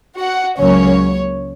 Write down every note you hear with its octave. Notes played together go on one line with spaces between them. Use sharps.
F#4 F#5
C#2 C#3 F#3 A#3 C#4 C#5